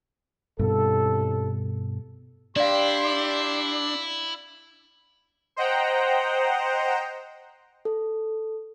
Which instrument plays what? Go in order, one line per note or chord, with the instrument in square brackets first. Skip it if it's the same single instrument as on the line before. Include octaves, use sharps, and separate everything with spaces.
[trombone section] C2 A4 [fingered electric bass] G2 B2
[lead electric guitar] D4 [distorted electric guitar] E4 [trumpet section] G4 C6 [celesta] D5 F5
[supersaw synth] C5 D#5 F#5 G5 A#5
[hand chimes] A4